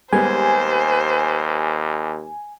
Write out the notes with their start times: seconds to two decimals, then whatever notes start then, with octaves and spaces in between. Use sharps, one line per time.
0.13 D#2 G3 G#3 B3 C5 G#5